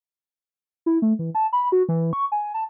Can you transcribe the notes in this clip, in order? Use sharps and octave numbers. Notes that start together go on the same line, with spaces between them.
E4
A3
E3
A5
B5
F#4
E3
C#6
G#5
A5